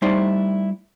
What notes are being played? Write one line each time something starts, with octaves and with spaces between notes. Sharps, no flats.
G3 A3 D#4 E4 C5 D5